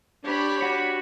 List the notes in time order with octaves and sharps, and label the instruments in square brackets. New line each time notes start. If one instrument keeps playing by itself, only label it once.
[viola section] D4 C#5 B5 [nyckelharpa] G4
[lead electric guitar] F#4